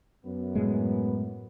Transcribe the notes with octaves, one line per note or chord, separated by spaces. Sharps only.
F#2 B3
A2 G#3